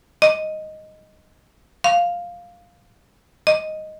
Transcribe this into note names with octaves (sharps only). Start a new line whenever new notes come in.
D#5
F5
D#5